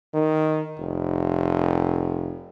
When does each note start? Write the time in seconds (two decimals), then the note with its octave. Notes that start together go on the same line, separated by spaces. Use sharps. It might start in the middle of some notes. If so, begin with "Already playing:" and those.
0.14 D#3
0.79 F1